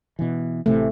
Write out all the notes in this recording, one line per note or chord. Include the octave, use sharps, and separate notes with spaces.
B2 E3
A1 C3 E3 A3